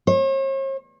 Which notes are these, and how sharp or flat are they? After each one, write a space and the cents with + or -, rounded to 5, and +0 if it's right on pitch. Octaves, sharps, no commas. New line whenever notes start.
C#5 -45